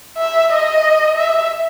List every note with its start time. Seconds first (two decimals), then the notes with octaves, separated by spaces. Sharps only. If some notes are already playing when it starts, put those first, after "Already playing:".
0.18 E5
0.51 D#5
1.17 E5